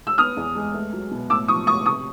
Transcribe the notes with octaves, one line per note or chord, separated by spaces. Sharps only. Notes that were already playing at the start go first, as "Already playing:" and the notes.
E6
B3 D#6 F6
E2
G#3
A3
F#3
B2
A2 D6 E6
F3 C#6 D#6
A2 C#6 D#6
C3 C#6 D#6